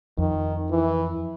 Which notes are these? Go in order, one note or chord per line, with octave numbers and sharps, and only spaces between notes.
F2 D#3
E3